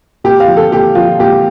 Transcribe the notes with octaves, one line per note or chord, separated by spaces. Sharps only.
A#2 G4
F5
F3
A4
A#2 G4
F3 F4
A#2 G4